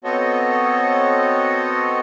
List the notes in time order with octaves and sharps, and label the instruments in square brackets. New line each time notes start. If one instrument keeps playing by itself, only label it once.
[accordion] B3 C4 F#4 A4 C#5 D#5